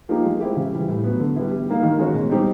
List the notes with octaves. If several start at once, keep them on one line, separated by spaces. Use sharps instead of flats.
F3 A#3 D#4 G4
G#3
C4 E4 G4
C#3
E3 G3
A2
F#3 B3
D3
G3 B3 E4
G3
A#3 D#4 G4
D#3
G#3 C#4 F#4
B2
G3 C4 D#4 G4